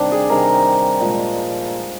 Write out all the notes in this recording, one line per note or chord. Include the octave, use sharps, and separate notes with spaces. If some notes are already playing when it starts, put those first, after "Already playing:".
Already playing: C3 D#3 G3 D4
G#4
C3 D#3 G3 A#4
A#2 F3 G#3